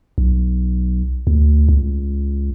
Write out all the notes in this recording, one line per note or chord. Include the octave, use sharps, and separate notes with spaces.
B1
D2
C#2